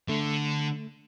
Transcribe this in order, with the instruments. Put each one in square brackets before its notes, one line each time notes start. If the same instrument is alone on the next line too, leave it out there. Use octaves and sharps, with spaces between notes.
[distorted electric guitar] D3 [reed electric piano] A3